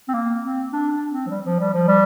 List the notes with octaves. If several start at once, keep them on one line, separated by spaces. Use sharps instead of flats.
C4
A#3
C4
D4
D4
C4
F3
G3
F3
G3
F3
G3